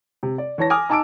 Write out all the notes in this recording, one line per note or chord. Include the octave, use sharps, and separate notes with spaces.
C3
D5
E3 C#5 A5 A#6
G#5 D6 D#6 F6
D#4 G#5 A5 D6 E6 D7